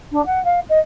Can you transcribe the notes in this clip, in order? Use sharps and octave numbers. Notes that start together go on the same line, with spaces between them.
D4
F#5
F5
D#5